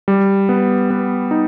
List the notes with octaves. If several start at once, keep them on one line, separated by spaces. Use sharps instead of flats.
G3
B3
B3
D#4